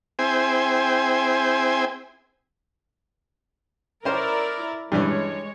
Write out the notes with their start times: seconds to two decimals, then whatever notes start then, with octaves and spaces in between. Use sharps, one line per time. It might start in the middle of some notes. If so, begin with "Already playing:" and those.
0.19 C4 E4 G#4 C5 G5 G#5
4.05 C#4 E4 A#4 C5 D5
4.92 G2 E3 G#3 C#4 C#5